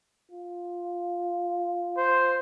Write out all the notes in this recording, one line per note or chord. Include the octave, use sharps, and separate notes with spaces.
F4
C5